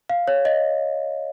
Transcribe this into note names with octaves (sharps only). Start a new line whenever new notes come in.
F5
C#5
D#5